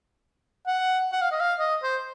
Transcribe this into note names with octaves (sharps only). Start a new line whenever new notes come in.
F#5
F#5
F5
D#5
F5
D#5
C5